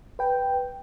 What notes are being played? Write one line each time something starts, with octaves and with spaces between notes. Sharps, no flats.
B4 G5